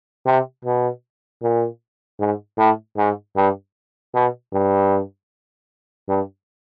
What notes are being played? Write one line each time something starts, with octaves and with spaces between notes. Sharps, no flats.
C3
B2
A#2
G#2
A2
G#2
G2
B2
G2
G2